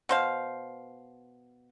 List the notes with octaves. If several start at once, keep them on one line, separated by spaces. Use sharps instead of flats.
B2 C5 F5